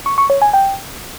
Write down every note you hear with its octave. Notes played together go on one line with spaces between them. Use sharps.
C#6
C#6
C#5
G#5
G5